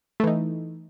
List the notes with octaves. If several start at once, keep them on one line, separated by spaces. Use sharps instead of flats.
E3 A3 D#4